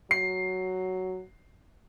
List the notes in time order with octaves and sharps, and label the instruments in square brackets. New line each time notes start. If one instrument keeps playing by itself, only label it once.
[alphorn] F#3 [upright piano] C7